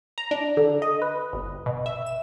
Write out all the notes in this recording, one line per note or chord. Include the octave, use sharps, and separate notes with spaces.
A#5
D4
D3
D#5
B4
G1
B2
E5
E7